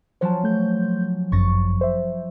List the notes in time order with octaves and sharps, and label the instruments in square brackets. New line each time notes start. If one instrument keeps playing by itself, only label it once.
[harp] F3 F#3 C#4 [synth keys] C5 A5
[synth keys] A3 G6
[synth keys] G1 F#2 [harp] C#6 A6 A#6
[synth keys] C5 E5